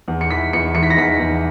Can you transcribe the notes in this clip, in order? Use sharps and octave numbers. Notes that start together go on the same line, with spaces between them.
E2
C#7
E3 B6
E2 C#7
E3 C#7
B6
A#6
E2 B6
E2